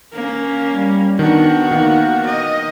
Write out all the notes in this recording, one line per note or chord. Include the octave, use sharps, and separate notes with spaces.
A#3 C#4
G3
D#3 B3 D4 F#4
D#3 A#3
D#5